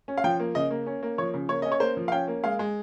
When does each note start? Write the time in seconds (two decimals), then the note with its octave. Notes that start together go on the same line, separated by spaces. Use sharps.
0.08 C#4
0.18 F5
0.24 F3 G5
0.40 A#3
0.55 C#3 D#5
0.70 A#3
0.87 C#4
1.03 A#3
1.18 F3 C#5
1.34 C#3
1.49 A#3 C#5
1.62 C#4 D#5
1.72 C#5
1.80 A#3 C5
1.97 F3
2.08 F5
2.12 C#4 G5
2.28 A#3
2.44 G#3 F5
2.59 G#3